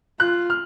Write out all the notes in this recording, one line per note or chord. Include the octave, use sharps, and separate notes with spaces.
F4 F#6
F6